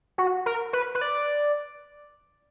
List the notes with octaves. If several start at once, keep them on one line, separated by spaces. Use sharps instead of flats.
F#4
A#4
B4
B4
D5